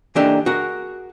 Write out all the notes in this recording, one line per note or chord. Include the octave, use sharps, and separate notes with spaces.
E3 A#3 D4 D#4 G4 A4
F#4 G#4 A#4